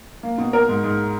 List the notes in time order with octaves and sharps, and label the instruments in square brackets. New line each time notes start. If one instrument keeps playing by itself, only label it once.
[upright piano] A#3
B2
A#4
G#2
G#2